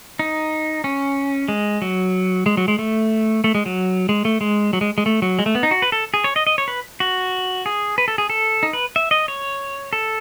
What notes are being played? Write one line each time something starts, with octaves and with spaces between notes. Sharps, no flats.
D#4
C#4
G#3
F#3
G#3
F#3
G#3
A3
A3
G#3
F#3
G#3
A3
G#3
F#3
G#3
G#3
A3
F#3
G#3
A3
B3
D#4
F#4
B4
A4
G#4
C#5
D#5
D#5
C#5
B4
F#4
G#4
B4
A4
G#4
A4
D#4
B4
E5
D#5
C#5
A4